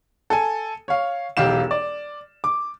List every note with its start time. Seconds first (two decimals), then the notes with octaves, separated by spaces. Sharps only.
0.30 A4 G#5
0.88 C#5 F5
1.37 E1 B1 G4 F5 E7
1.71 D5
2.44 D6